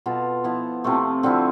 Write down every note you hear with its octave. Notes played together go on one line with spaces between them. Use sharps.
B2 B3 F4 A4
F3 B3 E4
C3 F3 A3
D3 F3 C4 E4